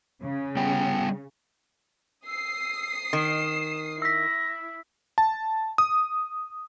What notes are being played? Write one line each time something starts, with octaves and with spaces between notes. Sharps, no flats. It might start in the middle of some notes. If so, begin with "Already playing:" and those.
C#3
G3 B3 G5
D#6 E6 C7
D#3 E7
E4 E6 A#6 B6
A5
D#6